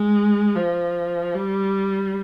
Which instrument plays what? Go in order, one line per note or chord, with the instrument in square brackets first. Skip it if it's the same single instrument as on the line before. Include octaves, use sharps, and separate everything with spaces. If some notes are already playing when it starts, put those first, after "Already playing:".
Already playing: [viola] G#3
F3
G3